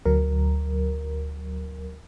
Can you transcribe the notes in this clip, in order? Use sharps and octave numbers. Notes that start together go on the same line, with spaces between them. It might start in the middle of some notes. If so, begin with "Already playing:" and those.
D2 F#3 A#4